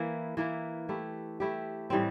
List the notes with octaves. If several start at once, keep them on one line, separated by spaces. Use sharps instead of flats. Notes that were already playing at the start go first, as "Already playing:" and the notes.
Already playing: E3 A#3 E4
E3 A#3 E4
A3 E4 G4
A3 E4 G4
A2 E3 G3 C4